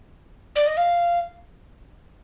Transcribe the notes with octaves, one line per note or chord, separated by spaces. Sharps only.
D5
D#5
F5